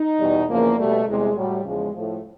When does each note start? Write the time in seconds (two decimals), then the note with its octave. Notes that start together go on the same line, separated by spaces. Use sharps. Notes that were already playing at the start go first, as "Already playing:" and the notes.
Already playing: D#4
0.20 E2 B2 G3
0.49 E2 C#3 F3 A#3
0.78 B2 G3 A3
1.06 E2 C3 E3 G3 G#3
1.36 A2 F#3 G3
1.65 E2 C#3 F3 G#3
1.94 A2 F3 A3